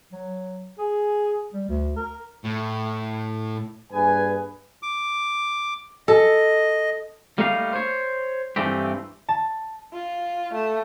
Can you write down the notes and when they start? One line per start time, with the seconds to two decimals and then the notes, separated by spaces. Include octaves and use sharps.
0.13 F#3
0.79 G#4
1.54 G3
1.69 D2
1.97 A#4
2.44 A2
3.92 G2 A#3 G#4 B4 G#5
4.83 D6
6.08 A4 D#5
7.38 G3 A3 A#3 D#4 A#4 F5
7.73 C5 C#5
8.56 G2 E3 A3 C4 G4
9.29 A5
9.93 F4
10.54 A3